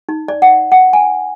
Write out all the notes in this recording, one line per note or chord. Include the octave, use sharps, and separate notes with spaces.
D#4
D5
F#5
F#5
G#5